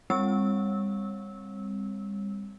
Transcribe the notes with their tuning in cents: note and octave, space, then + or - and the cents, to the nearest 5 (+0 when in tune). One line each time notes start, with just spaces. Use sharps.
G3 +40 C4 +0 E6 -20